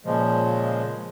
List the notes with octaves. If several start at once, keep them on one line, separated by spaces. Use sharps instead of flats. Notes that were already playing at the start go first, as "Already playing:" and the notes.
A#2 C#3 F3 G#3